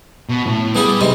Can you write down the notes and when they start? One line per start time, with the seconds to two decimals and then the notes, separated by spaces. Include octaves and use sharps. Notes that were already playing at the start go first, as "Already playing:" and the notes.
0.29 B2
0.46 A2
0.75 G3 B3 E4 G#4
1.01 G#2 C3 G#3